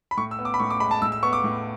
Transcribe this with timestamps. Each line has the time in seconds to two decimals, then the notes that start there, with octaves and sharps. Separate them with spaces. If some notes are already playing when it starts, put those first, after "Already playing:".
0.11 B5
0.17 A2 C#6
0.31 E6
0.39 B3
0.45 D6
0.54 B5
0.60 A2 C#6
0.70 D6
0.80 G#3 B5
0.91 A5
1.02 A2 E6
1.12 E6
1.23 B3 C#6
1.33 D6
1.44 A2